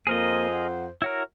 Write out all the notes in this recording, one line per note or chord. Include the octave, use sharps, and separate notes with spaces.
F2 A#3 G#4 A#4 C5 D#5
F#5
E4 F#4 A#4 C#5